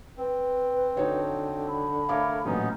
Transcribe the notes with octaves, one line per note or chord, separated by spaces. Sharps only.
C4 B4
D3 D#4 F#4 C#5
B5
A3 A#4 C#5 F5 D6
A1 A#2 F#3 B3 C#4 D#4